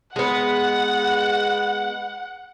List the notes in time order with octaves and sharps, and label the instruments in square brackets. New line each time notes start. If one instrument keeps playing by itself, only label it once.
[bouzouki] G#3 B3 [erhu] F#5